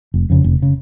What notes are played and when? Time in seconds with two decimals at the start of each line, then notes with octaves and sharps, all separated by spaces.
0.14 F1
0.30 F2 C#3
0.44 F1
0.62 C#3